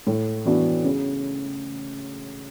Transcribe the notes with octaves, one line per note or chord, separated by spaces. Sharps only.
A2
E3 B3 D4 F#4
C#3